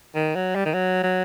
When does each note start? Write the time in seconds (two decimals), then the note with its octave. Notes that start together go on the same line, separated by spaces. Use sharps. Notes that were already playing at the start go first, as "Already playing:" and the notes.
0.15 D#3
0.35 F#3
0.55 G3
0.66 D#3
0.74 F#3
1.03 F#3